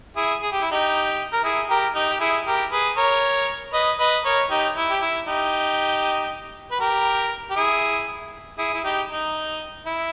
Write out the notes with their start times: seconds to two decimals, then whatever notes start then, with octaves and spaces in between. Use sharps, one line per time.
0.16 E4 G#4
0.42 G#4
0.52 G4
0.62 E4
0.72 D#4 G4
1.33 A#4
1.44 E4 G#4
1.69 G4 A#4
1.95 D#4 G4
2.10 G4
2.20 E4 G#4
2.46 G4 A#4
2.72 G#4 B4
2.97 A#4 C#5
3.73 B4 D#5
3.99 B4 D#5
4.25 A#4 C#5
4.50 D#4 G4
4.76 E4
4.90 G4
5.01 E4
5.27 D#4 G4
6.71 B4
6.80 G4 A#4
7.50 G4
7.56 E4 G#4
8.58 E4 G#4
8.74 E4
8.84 D#4 G4
9.10 D#4
9.86 E4